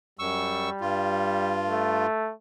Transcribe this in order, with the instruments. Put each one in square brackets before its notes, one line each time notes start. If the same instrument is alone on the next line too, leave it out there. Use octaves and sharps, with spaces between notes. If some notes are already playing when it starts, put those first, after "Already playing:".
[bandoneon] F#2 C#6 E6 [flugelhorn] G3
[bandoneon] G2 F4
[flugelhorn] A3